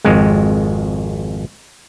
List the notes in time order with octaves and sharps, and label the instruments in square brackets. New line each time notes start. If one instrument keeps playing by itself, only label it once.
[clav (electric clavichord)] G#1 F2 G#3